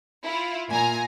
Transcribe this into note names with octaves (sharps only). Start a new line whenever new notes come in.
E4 F4
A#2 G#5 A#5